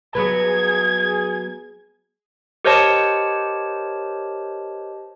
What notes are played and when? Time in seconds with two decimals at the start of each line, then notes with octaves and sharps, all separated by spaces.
0.15 F#3 B3 G#4 B4 G#6
2.65 G4 A#4 C5 C#5 D#5 A5